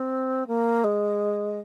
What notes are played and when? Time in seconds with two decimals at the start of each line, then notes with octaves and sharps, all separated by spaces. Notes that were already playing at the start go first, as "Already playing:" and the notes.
Already playing: C4
0.47 A#3
0.84 G#3